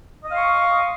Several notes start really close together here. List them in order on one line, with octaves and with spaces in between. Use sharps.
D#5 D#6 F5 C6 C#6